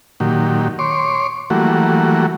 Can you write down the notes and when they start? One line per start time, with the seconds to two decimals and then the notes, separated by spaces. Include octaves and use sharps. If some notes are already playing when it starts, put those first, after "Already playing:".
0.20 A#2 D#3 F#3 G4
0.79 C#5 C6 D6
1.50 E3 F#3 G3 A3 A#3 F#4